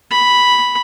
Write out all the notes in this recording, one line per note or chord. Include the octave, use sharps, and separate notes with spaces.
B5